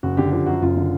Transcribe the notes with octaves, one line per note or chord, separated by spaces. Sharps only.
F#1 F#4
D3 G4
F3 G4
F#2 F#4
F#1 F4
D3